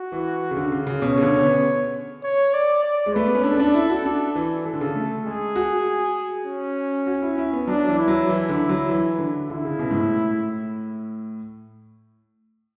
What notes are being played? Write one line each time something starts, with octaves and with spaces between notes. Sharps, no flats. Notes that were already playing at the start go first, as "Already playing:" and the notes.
Already playing: F#4
E3
C#3
D3
C#3
C#3
B2 C#5
C#3
D3
C#4
B3
C#5
D5
D5
G#3
A3 B4
B3
C#4
D4 A4
D4
E4
F#4
D4
E3
E3 A4
D3
C#3
D3
A3
G#3 G#4
F#4
C#4
F#4
E4
E4
B3
F#3 D4
E3
E4
F#3
E3
D3
F#3
E3
D3
D3 E4
C#3
B2
G#2
A2